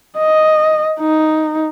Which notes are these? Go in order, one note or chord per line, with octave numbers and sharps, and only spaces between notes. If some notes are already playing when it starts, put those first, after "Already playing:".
D#5
D#4